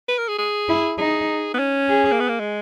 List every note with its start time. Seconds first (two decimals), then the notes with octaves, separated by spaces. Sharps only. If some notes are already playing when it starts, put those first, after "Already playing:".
0.08 B4
0.18 A#4
0.28 G#4
0.38 G#4
0.69 E4
0.98 D#4 G#4
1.54 B3
1.59 C#4
1.89 G#4
2.12 A#3
2.19 B3
2.28 A#3
2.39 G#3